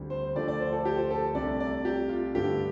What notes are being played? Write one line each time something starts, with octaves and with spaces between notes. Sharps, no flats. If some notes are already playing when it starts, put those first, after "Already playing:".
Already playing: D2 D3 G3 C4
C5
D2 D3 F3 A3 D4 D5
D5
C5
A4
G4
C5
A4
C2 C3 A3 D4 D5
D5
G4
F4
G2 D3 A3 D4 G4